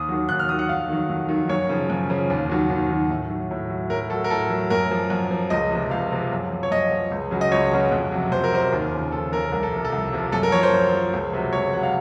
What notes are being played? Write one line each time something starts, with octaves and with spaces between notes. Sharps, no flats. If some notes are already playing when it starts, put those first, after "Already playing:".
Already playing: D#2 D#6
D#3 F#3
D#2 F#6
F6
D#3 F#3 D#6
F#5
F2 F5
D#3 F#3
F2
D#3 F#3
F#2 C#5
C#3 F3
F#2
C#3 F3
D#2
D#3 F#3
D#2
D#3 F#3
A2
F#3
A2
F#3
A2 A#4
F#3 A4
A#4
A2 A4
F#3
F#2 A#4
F3
F#2
F3
C#2 D#5
C3 F3
C#2 F5
C3 F3
F#2
F3
C#5
F#2 D#5
F3
C#2
C#3 F#3
D#5
C#2 C#5
C#3 F#3
F2
C3 F#3
F2 C5
A#4
C3 F#3 C5
D#2
C#3 F3
D#2 A4
C#3 F3 A#4
C2 A#4
A4
C3 F3
A4
C2
C3 F3
F#2 A4
A#4
F3 C#5
C5
F#2
F3
C#2
C3 F#3
C#2 C#5
C3 F#3 F#5
F5